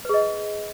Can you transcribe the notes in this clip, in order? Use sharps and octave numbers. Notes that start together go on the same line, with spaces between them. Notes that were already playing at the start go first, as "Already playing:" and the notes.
G#4 B4 D#5